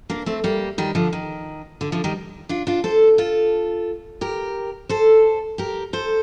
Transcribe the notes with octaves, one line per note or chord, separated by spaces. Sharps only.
A#3 D4
A3 C4
G3 A#3
D#3 G3
D3 F3
D#3
D3
D3 F3
D#3 G3
D4 F4
D4 F4
A4 C5
F4 A4
G4 A#4
A4 C5
G4 A#4
A4 C5